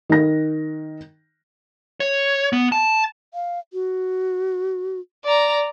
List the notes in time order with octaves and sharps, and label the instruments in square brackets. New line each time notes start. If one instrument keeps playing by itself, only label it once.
[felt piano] D#3 A#6
[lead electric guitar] C#5
B3
A5
[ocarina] F5
F#4
[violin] D5 A#5